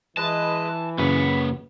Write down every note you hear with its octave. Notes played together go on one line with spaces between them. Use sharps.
E3 G#3 B4 D#5 A5
F#2 C#3 A#3 B4 C#5 B5 C#6